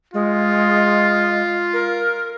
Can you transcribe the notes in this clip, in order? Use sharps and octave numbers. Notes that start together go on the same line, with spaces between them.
G#3 F4
A#4